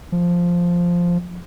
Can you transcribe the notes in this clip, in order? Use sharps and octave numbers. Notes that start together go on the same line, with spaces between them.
F3